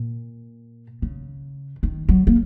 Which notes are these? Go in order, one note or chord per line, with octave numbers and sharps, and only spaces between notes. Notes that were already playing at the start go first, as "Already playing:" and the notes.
Already playing: A#2
C#3
D#3
F#3
A#3